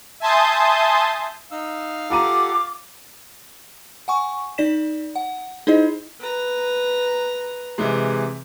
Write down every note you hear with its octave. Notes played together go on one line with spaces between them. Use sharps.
E5 G#5 A5 C6 D#6 G6
D#4 F5 E6
F4 G4 A4 F#5 A#5 D6 D#7
F#5 G#5 C#6
D#4 D5 B6 E7
F#5
D#4 E4 G#4 C5 D#5
B4 A#5
C3 E3 G#3